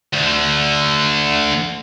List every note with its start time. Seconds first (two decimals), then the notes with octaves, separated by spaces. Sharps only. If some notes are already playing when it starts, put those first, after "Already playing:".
0.13 D2 D3